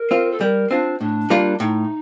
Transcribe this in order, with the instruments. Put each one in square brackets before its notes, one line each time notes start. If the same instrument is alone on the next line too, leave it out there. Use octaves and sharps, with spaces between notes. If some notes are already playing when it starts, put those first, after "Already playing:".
Already playing: [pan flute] A#4
[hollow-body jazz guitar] C4 F4
[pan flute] A4
[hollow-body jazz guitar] G3 [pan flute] A#4
[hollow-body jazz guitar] C4 F4 [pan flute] D4
[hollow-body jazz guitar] A2 [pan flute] D4
[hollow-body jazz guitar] G3 A#3 F4 A#4
[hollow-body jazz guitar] A2 [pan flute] D#4